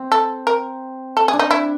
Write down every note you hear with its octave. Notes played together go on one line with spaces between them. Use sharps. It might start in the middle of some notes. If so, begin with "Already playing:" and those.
Already playing: C4
A4
A#4
A4
G#4
D4
D#4
E4